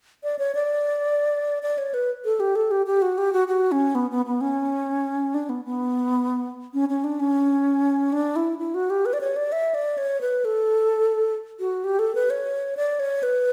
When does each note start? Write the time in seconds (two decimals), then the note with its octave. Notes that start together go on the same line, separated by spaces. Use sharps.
0.24 D5
0.39 C#5
0.55 D5
1.63 D5
1.78 C#5
1.94 B4
2.25 A4
2.40 G4
2.55 A4
2.71 G4
2.86 G4
3.02 F#4
3.18 G4
3.33 F#4
3.48 F#4
3.72 C#4
3.95 B3
4.11 B3
4.26 B3
4.41 C#4
5.34 D4
5.49 B3
5.65 B3
6.74 C#4
6.89 C#4
7.04 D4
7.20 C#4
8.12 D4
8.36 E4
8.59 E4
8.74 F#4
8.90 G4
9.06 B4
9.13 D5
9.21 C#5
9.36 D5
9.52 E5
9.74 D5
9.98 C#5
10.21 B4
10.45 A4
11.60 F#4
11.84 G4
11.99 A4
12.15 B4
12.30 C#5
12.77 D5
13.00 C#5
13.23 B4